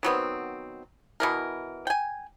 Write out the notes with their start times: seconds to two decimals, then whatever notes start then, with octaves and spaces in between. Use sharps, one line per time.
0.03 D#3 F#3 B3 C4
1.20 B2 E3 A#4
1.87 G5 G#5